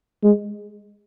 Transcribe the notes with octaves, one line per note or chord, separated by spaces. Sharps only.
G#3